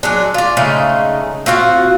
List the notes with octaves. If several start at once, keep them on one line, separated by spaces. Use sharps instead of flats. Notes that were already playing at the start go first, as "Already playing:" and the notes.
F#3 G#3 D4
F4 D5
C#3 G#3 A3 D#4
C4 F4 F#4 F5